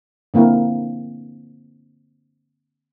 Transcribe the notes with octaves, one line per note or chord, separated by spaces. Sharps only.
D3 A#3 C4 E4 A#4